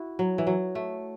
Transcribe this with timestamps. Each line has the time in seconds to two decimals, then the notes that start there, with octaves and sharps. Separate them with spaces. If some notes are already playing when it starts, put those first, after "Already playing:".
Already playing: E4 F#4
0.19 F#3
0.38 E3
0.47 F#3
0.75 A3